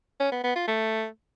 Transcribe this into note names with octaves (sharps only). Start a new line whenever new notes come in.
C#4
B3
B3
F4
A3